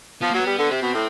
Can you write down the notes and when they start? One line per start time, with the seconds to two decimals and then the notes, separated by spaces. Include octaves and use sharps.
0.22 F3 B3
0.30 A#3
0.34 F#3
0.39 B3
0.46 G3
0.58 D3
0.70 C3 C4
0.82 B2
0.94 A2